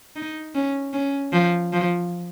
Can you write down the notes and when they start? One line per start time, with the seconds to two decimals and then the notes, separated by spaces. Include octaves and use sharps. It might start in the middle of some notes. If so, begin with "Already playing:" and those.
0.16 D#4
0.55 C#4
0.93 C#4
1.33 F3
1.73 F3